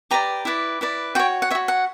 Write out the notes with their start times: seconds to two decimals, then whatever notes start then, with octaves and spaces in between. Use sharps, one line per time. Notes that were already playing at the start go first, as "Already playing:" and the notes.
0.11 G4 B4 D5 A#5
0.45 E4 B4 D5
0.81 E4 B4 D5
1.15 F#4 C#5 G5
1.42 F#5
1.50 C#5 E5
1.55 F#4
1.68 F#5